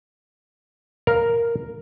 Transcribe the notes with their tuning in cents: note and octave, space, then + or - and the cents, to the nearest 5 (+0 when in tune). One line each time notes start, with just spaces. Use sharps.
A#4 +0 F5 +0